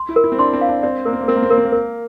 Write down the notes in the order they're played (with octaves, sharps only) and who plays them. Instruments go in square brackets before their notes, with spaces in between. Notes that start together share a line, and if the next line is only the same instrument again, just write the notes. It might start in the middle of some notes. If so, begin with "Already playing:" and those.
Already playing: [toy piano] C6
[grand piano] E4
[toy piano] A#4
[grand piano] E4
C4
[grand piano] D4 [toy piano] C6
[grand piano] C4
[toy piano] F5
[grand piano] D4
[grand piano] C4 [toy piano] D5
[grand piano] A#3 [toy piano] A#4
[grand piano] C4
A#3
[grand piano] C4 [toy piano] A#4
[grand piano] A#3
C4
[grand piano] A#3 [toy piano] A#4
[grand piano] C4
A#3
[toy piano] A#4